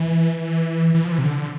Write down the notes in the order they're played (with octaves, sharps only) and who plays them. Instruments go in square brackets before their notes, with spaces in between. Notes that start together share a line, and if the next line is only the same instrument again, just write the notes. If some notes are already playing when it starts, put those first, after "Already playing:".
Already playing: [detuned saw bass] E3
E3
F3
E3
C3
D3